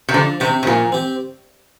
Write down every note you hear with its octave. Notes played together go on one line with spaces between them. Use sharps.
C3
D3 F3
C3 C4 G4
C3
A#2 F3
C4 G4